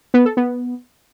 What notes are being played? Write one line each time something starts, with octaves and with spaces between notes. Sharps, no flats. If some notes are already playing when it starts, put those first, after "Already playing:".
B3
A4
B3